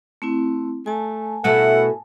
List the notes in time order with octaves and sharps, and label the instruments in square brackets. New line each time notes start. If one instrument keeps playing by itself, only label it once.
[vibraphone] A3 C4 E4
[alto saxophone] A3 [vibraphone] G#5 A5
[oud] B2 A3 E4 [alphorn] A4 [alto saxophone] F#5